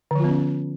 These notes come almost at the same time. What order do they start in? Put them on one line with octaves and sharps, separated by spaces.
D3 F3 F4 B3 C#4